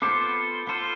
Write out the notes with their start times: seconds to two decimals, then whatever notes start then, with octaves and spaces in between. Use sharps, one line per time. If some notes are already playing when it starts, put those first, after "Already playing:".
0.02 B3 F4 A4 C5 D6
0.67 B3 F4 A4 C5